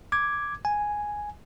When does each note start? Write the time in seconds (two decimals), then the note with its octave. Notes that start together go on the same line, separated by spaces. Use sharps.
0.12 D6 G#6
0.65 G#5